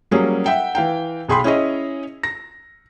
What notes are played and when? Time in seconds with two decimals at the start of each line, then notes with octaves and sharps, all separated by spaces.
0.11 F#3 G3 A#3 C#4 G#4
0.46 E5 F#5 G5
0.75 E3 F5 G5
1.29 B1 G#4 G5 B5 C6
1.44 C#4 E4 G#4 C#5 D#5
2.23 A#6